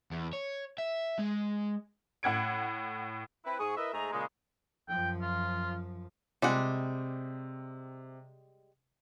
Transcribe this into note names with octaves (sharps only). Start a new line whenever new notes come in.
E2
C#5
E5
G#3
A2 F#5 G#6 D7
C4 E4 B4
G#2 G#4 C#6 D#6
E4 A#4 B4 D#5 E5
G#2 G#3 A3 G#4 A#5
A#2 C#3 G#3
F#2 F3 G5
F4
C3 G3 G#3 F#5